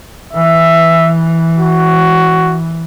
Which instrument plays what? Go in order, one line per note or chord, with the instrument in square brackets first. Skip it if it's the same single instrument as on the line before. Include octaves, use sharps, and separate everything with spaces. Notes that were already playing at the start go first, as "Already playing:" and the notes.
[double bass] E3 [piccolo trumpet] E5
[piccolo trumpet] F#4